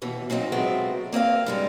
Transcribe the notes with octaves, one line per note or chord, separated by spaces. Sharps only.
D#2 B2 E3
A#2 F#3 C4 D#4
F3 F#3 G#3 A3 B3 C4
A#3 C4 D#5 F5
G2 G3 G#3